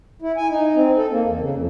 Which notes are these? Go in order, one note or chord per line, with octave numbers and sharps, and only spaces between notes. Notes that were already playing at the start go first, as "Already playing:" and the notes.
E4
G#5
D#4
C4
A4
A#3
E2
C#3
F2